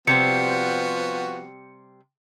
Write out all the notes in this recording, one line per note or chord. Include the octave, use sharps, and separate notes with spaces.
C3 F3 G3 B3 C4 F#4 C#7